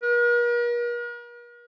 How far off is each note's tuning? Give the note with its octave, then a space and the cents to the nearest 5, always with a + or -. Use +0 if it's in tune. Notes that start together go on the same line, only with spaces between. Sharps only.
A#4 +45